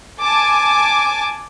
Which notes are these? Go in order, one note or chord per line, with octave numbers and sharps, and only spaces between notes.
G#5 A5 D6